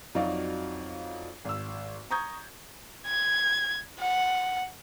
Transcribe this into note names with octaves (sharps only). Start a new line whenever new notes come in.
F2 F#3 D#4 F#4 D5 F5
G#1 E6
A#5 C#6 D#6 G6 G#6
G#6
F#5